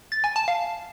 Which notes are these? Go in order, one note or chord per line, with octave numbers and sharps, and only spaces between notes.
A6
G#5
A5
F5